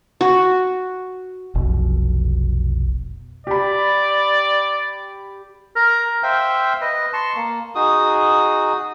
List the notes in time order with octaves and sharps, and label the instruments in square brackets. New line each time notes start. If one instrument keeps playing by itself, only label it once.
[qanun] F#4
[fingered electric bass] F1 B1 B2
[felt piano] G4 B5 [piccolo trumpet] D5
[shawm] A#4
[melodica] C5 E5 F5 G5
B4 D#5
A5 C6 C#6
A#3
D#4 F#4 G#4 D#6